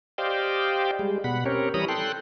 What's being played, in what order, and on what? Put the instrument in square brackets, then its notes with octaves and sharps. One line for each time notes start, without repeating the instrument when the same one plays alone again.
[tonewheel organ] G4 C5 D5 D#5 F5 G5
G3 G#3
B2 F#5 B5
C4 C#4 G4 A#4 C#5
E3 G3 C#5 A#5 B5 D#6
A4 G5 C6 F#6